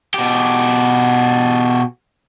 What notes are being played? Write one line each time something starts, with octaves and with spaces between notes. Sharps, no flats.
B2 G4